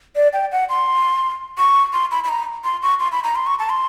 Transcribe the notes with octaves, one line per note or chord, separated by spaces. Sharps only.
D5
G5
F#5
C6
C#6
C6
B5
B5
A#5
C6
C#6
C6
B5
A#5
C6
C#6
A5
C6